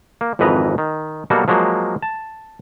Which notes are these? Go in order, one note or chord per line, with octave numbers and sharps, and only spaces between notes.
A#3
G#1 F2 E3 B4 D#5 A#5
D#3
B2 F#3 G3 A#3 F#4 A4
F3 F#3 G#3 A#3
A5